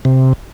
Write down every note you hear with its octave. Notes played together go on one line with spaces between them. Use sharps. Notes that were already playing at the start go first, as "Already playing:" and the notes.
C3